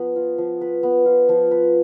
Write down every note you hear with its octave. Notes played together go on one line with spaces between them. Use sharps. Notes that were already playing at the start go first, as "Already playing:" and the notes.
Already playing: F3 B3 B4
F4
F3
B4
B3
F4
F3
B4